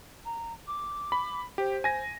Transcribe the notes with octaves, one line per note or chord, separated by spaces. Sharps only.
A#5
D6
B5
G4 C5
G#5 A#6